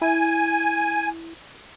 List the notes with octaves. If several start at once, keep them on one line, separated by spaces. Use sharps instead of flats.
E4 G#5